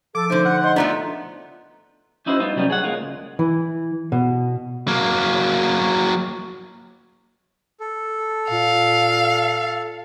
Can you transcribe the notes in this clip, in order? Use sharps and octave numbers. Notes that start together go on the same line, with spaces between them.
F3 A4 D6
D3 A3 D#4 C5
F#5
D#5 C6 G6
F3 A3 B3 D4 A#5
C#4 D#4 E4 F#4 A#4 C5
G3 B3 D#4 F4
C2 F#3 G3 B3 C#4
G#4 C#5 F#5
G#3 A#3 F4
C#2
E3
B2
F#3 A#3
A4
A#2 F5